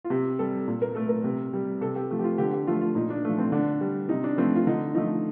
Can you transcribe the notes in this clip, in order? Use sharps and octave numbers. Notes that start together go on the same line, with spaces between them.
F4
C3 G4
G3 A4
A#2
A#4
A3 A4
A#4
C3
G3
C3 A4
G4
F3 A3
G4
F4
D3 G4
G4
F3 A3 F4
F4
A#2 D#4
D4
F3 A3
C4
D3 D4
G3
C3 D#4
D4
F3 A3 C4
F4
D3 D#4
F3 A3 D#4